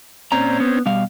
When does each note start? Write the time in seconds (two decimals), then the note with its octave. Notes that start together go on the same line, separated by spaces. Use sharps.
0.32 A#2 C4 C#4 D5 A#5
0.60 B3
0.86 B2 G3 F5